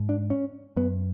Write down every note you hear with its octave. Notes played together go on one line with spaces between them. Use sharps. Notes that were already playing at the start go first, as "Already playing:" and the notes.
Already playing: G#2
D4
C#4
F#2 B3